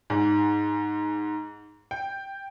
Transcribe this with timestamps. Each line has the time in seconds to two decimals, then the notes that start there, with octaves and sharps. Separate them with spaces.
0.10 G#2
1.91 G5